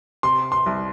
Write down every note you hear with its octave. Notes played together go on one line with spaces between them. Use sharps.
C3 C6
C6
C2